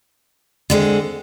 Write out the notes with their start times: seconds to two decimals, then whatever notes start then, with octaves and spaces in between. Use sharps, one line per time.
0.70 D3 G#3 C4